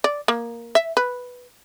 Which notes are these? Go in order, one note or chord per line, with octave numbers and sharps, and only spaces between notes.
D5
A#3
E5
B4